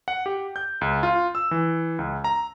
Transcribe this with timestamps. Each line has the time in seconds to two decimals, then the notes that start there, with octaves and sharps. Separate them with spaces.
0.08 F#5
0.26 G4
0.56 G6
0.81 C#2
1.03 F4
1.35 E6
1.51 E3
1.99 C#2
2.24 A#5